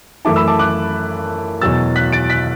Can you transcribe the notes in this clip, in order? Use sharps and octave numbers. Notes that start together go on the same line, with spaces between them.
F#2 E3 A3 E4 A5 D6
B5 E6
A5 D6
D6 F#6
E2 B2 F#3 E6 A6
F#6 B6
A6 D7
F#6 B6